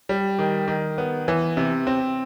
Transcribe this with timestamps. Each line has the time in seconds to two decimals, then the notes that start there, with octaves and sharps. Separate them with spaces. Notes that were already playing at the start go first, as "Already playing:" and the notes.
0.09 G3
0.39 D#3
0.68 D#3
0.98 B3
1.28 E3
1.57 C3
1.87 C4